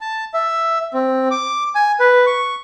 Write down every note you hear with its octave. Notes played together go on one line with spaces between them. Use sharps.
A5
E5
C4
D6
G#5
B4
C#6